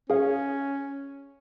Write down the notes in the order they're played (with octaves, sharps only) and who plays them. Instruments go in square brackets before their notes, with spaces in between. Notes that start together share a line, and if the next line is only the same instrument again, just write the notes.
[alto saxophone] C#4 [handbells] G#4 F5